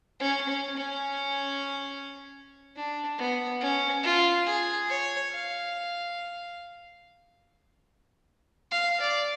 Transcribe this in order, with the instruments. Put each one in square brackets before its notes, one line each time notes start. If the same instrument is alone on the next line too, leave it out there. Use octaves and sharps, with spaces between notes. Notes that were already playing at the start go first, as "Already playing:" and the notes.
[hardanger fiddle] C#4
C#4
C#4
D4
B3
C#4
F4
G#4
C#5
F5
F5
D5